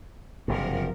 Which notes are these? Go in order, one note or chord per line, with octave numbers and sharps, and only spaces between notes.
F#1 G2 C3 F3 A#4